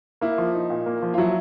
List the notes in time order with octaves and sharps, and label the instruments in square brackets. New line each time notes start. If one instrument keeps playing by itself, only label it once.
[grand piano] A#3 [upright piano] E4
[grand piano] F3
D#4
A#2
A#3
F3
[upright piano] F4
[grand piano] F#3 [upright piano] E4